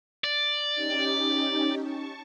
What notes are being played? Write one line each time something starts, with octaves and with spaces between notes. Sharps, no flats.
D5
C#4 D#4 G4
A5 C#6